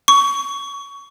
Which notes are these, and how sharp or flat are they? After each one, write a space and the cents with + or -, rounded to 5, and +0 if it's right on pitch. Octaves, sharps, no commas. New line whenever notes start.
C#6 +20